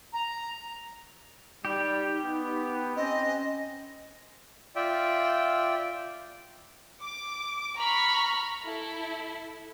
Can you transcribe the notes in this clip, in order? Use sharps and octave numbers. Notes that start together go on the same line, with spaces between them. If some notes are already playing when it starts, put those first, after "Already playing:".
A#5
G3 D#4 G4
B3
C4 C#4 D#5
F4 D5 E5 G5
D6
A#5 B5 C#6 F6
E4 A4